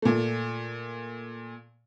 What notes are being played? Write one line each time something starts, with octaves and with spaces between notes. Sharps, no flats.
A#2 A3